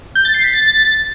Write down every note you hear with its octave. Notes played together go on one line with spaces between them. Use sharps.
G6
A6
C7
B6
A6